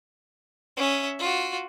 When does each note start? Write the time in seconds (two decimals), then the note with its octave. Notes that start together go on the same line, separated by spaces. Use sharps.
0.77 C#4 E5
1.19 F4 F#4